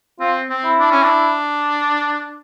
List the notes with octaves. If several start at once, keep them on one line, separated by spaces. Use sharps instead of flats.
C4 F4
C4
E4
D4
C#4
D4